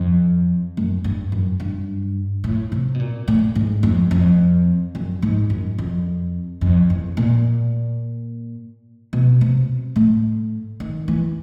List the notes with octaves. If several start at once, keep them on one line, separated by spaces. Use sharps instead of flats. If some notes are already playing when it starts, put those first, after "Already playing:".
Already playing: F2
F#2
G2
F#2
G2
A2
C3
B2
A#2
A2
G#2
F2
F2
F#2
G#2
F#2
F2
F2
E2
A#2
B2
C3
A2
D#3
E3